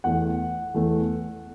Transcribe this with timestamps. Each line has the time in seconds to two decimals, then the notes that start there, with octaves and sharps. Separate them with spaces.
0.04 E2 E3 A3 F#5
0.74 E2 E3 A3